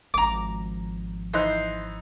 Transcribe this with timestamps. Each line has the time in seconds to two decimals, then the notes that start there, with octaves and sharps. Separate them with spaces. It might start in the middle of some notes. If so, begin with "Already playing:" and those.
0.14 G#1 F3 A#5 D6
1.33 E3 D#4 C5 F#6